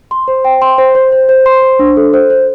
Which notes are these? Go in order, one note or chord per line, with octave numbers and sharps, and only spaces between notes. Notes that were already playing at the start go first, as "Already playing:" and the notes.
C6
C5
G5
C6
C5
C5
C5
C5
C6
C5
D4
A4
C5
C5